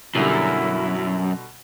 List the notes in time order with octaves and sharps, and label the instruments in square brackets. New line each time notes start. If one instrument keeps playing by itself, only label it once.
[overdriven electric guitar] F#2 [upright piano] B2 D3 G3 [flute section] E4